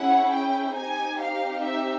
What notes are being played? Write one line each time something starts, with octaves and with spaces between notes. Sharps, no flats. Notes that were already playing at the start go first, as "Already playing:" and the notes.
Already playing: C#4 E4 G#4 F#5
G5
C4 D#4 G4 G#5
F5
E5